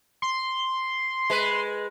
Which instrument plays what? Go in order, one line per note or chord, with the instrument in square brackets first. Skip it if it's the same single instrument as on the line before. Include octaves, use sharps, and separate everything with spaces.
[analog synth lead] C6
[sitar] G#3 B4